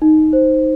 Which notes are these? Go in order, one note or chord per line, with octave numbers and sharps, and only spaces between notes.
D#4
C5